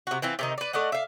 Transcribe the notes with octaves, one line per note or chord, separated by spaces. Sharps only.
C3 F#4
E3 C4 F4
C3 D#3 D#4
B4 D5
A3 D5 D#5 F#5
E5 F5